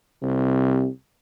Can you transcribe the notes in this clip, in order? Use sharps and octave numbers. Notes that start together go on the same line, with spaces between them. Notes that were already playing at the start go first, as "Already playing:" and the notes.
C2 C3